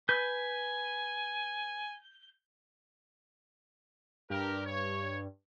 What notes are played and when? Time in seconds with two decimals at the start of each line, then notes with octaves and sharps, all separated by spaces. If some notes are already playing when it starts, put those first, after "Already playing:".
0.09 B4 G#5 G6
4.30 G2 G4 A#4
4.65 C#5